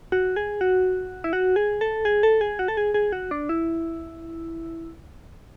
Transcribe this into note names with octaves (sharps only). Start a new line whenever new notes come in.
F#4
G#4
F#4
E4
F#4
G#4
A4
G#4
A4
G#4
F#4
A4
G#4
G#4
F#4
D4
E4